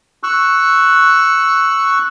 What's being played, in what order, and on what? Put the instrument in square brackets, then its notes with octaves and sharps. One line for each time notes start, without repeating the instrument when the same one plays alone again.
[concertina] C#6 E6 F#6